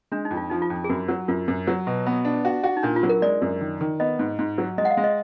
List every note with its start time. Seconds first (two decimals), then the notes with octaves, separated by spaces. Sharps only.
0.12 G#3 D4
0.25 D#4
0.31 F2
0.37 F4
0.50 F3 D#4
0.62 F4
0.70 F2
0.84 G#4
0.89 F#2 F#4
1.08 F#3
1.28 F#2 F4
1.48 F#2
1.67 F#3
1.87 B2
2.06 B3
2.25 D4
2.45 F#4
2.63 F#4
2.77 D#4
2.83 A#2 D4
2.96 F4
3.03 F#3
3.09 A#4
3.22 G#3 D5
3.42 F#2
3.61 D#3
3.81 D#3
4.00 B3 D#5
4.19 G#2
4.39 G#2
4.58 F#3
4.78 G#3 D#5
4.85 F#5
4.91 F5
4.97 G#3
5.04 D#5